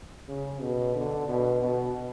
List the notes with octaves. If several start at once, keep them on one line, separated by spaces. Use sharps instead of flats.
C#3
B2
D3
B2
B2